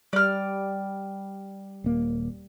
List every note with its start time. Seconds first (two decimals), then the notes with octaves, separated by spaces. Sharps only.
0.13 G3 D5 F6
1.84 D#1 A#3